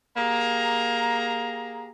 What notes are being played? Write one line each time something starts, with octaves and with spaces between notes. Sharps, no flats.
A#3 G4 G#4 A#5